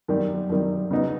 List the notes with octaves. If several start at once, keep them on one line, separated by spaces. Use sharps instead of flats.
F#2 D#3 G3
F#2 D#3 G3
C#3 F#3 B3 D#4